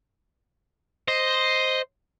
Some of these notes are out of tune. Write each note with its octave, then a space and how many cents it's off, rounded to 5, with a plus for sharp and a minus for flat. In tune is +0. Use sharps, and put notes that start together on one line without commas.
C5 +0 D#5 +0